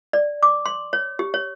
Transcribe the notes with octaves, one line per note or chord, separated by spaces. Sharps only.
D5
D6
C6
C#5
G4
C#5